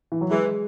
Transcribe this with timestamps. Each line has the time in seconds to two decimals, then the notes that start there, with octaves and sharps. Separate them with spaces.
0.12 E3
0.21 F#3
0.30 E3 G#3